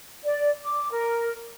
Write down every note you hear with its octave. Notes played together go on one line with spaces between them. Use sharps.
D5
D6
A#4